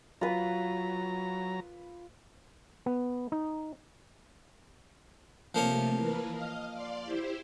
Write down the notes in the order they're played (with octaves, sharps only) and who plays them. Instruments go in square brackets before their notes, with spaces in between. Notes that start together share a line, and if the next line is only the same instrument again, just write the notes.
[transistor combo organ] F#3 A#5 [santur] F4 B4
[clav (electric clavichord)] B3
D#4
[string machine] C3 A3 [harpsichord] F3 A#3 C#5
[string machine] E3 A#4 B4
D#5 F5 F6
D5 F5 C6
E4 G4 C5